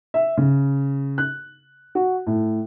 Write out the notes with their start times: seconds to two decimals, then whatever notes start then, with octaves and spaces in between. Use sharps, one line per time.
0.14 E5
0.37 C#3
1.18 F#6
1.95 F#4
2.27 A2